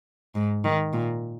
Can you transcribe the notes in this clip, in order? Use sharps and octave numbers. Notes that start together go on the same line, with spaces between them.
G#2
D#3
A#2